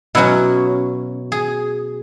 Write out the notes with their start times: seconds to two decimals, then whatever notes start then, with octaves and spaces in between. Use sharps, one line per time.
0.15 B2 F#3 C#4 E4
1.32 G#4